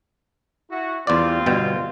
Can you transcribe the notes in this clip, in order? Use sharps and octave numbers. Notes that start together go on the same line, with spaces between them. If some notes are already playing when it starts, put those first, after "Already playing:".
E4 F#4
E2 G3 C4 F4 D5
G1 B2 G5